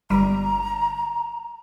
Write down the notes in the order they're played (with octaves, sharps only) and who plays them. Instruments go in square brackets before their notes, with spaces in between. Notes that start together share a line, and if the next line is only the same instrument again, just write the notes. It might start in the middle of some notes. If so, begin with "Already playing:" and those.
[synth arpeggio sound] G1 G3 [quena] A#5